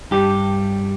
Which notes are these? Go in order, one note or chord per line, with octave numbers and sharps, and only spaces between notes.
G2 G3 G4